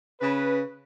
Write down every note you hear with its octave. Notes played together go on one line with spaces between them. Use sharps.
C#3 B4